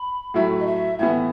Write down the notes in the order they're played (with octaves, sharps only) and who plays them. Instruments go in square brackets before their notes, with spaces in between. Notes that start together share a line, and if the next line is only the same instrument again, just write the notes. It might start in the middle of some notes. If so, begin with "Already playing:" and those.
Already playing: [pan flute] B5
[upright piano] A2 F#3 A3 E4
[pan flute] D#5
E5
[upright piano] A2 E3 B3 [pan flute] E5